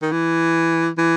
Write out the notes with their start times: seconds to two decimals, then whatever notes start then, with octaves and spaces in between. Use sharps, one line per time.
0.02 D#3
0.12 E3
0.98 E3